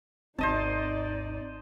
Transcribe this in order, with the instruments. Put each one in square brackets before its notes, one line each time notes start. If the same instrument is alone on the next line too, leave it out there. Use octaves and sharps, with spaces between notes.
[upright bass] G#1 D#2 [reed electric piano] C4 [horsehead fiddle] D#4 D5 [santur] C5 D#5 A5